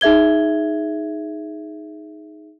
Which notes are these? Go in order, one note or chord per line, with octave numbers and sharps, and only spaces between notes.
D#4 G#4 E5 G#6 G7